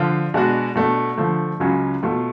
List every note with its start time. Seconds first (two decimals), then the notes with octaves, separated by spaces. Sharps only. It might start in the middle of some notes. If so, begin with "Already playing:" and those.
Already playing: D3 F3 F4
0.34 B2 G#3 D4 F#4
0.75 B2 A3 D4
1.18 D3 F3 A3
1.60 C#2 C#3 F#3 C#4 F4
2.02 B2 A3 F4